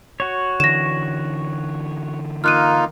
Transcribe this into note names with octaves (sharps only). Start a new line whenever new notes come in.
F#4 C#5
D3 E3 A#6 E7
A#3 D#4 F4 F6 F#6 D#7